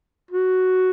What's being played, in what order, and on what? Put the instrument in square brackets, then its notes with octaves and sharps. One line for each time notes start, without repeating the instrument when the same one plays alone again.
[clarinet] F#4